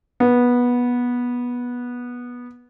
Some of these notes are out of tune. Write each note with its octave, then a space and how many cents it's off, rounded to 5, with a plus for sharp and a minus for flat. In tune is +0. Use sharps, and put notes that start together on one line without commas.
B3 -15